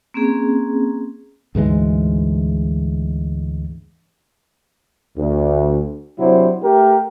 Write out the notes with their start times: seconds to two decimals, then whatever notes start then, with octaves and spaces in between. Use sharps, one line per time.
0.14 A#3 C4 C#4 G#4
1.55 D2 G#2 E3 G#3
5.18 D2
6.19 C3 F#3 D4 E4 C5
6.63 A3 G4 A#4